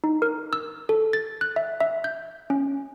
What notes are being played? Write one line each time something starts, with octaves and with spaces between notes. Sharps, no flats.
D#4
A#4
E6
A4
A6
F#6
E5
E5
G6
C#4